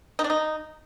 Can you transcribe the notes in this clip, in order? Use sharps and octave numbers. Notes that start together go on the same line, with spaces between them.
D#4
D4
D#4